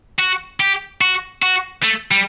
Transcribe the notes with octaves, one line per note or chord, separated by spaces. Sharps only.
F#4
G4
F#4
F#4
A3
G3